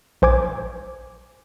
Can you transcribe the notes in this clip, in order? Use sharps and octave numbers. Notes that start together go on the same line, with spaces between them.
A#1 C5 G#5 D6 G#6